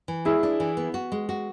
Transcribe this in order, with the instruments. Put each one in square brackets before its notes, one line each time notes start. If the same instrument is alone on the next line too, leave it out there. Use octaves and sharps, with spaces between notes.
[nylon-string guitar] E3
[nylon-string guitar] G#3 [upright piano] E4 G#4
[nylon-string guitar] D4
E3
B3
F#4
G#3
F#4